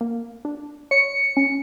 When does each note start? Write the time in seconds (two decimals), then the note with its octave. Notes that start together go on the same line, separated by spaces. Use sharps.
0.01 A#3
0.45 D4
0.91 C#5 C#7
1.37 C#4